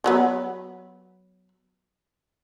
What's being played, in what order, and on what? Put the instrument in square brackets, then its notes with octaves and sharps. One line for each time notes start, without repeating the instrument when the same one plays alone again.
[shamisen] F3 F#3 B3